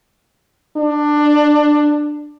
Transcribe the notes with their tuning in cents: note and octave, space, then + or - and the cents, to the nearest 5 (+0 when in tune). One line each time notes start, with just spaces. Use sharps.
D4 +15